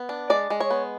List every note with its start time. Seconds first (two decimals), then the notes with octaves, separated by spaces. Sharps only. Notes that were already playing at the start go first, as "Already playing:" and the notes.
Already playing: B3
0.09 D4
0.30 G#3 D5
0.50 G#3
0.60 C#5
0.70 B3